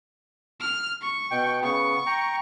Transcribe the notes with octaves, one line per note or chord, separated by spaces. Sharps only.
F6
C#6
B2 G5
C#3 B3 C#6
G5 A#5